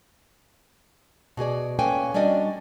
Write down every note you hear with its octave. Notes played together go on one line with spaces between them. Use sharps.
B2 F#4 G#4 D5
A#3 C#4 A4 B4 G5 G#5
G3 C#4 D4 F#4 D5 D#5